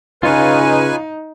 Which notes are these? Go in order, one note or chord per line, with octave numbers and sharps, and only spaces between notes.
C#3 D#4 F4 B4 C#5 F5 G#5